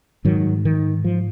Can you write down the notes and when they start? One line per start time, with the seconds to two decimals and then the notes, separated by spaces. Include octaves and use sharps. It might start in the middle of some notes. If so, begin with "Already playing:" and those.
0.25 G#2 D#3 F#3
0.65 D#3
1.04 F3